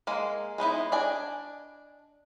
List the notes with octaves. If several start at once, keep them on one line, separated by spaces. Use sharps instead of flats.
G#3 A#3
G#3 B3 D#4 E4
D4 D5 D#5 G#5